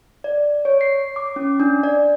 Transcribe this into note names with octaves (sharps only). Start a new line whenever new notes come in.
D5
C#5
C7
D6
C#4
D4
D5